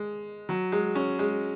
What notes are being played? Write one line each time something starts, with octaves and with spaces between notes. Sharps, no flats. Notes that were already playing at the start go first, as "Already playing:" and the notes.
Already playing: G#3
F#3
G#3
C#4
G#3